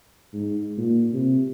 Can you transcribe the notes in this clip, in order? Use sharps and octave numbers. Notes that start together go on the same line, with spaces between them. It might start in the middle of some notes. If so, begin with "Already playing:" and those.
G#2
A#2
C3